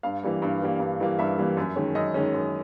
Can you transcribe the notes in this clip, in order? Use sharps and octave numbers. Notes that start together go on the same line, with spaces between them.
G2 F5
E3 G3 A#3
G2
E3 G3 A#3
G2
E3 G3 A#3
G2 E5
E3 G3 A#3
F#2
D#3 G#3 C#4
F#2 D#5
D#3 G#3 C#4
F#2